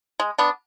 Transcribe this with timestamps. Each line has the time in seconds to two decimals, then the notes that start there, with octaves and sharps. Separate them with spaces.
0.20 G#3
0.38 B3 D4